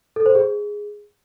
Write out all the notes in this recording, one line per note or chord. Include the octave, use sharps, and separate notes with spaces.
A4
C5
G#4